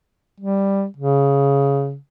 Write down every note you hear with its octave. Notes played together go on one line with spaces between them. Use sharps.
G3
C#3